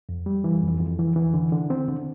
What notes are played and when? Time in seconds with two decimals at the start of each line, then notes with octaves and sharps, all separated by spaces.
0.09 F2
0.26 G3
0.44 E3
0.62 F2
0.80 F2
0.99 E3
1.16 E3
1.34 D3
1.52 D3
1.70 C4
1.88 D3